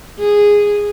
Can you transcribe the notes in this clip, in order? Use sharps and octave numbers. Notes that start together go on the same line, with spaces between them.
G#4